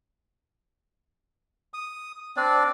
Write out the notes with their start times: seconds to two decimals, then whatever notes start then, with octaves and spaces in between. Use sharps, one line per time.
1.74 D#6
2.37 C4 D4 D5